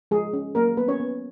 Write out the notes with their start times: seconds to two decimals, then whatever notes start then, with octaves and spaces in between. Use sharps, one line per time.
0.11 F3 G#3 G#4
0.33 C#4
0.55 F#3 A#3 A#4
0.77 A#3 B3 B4
0.88 C#4 C#5
1.00 B3